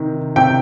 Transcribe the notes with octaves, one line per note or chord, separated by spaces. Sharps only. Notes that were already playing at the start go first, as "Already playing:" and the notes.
Already playing: C3 D#3
C3 G5